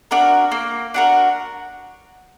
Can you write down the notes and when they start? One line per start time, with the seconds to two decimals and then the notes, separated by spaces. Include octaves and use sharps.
0.11 D4 F#4 A#4
0.52 A#3
0.94 D4 F#4 A#4